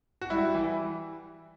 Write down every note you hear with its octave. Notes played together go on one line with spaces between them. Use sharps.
F#4
G3 E4
E3